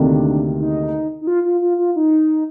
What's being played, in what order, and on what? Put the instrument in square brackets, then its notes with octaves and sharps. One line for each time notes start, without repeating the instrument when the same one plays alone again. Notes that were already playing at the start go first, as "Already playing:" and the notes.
Already playing: [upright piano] D2 C3 D#3 A#3 [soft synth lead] D4
[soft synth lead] D#4
D#4
F4
F4
F4
F4
D#4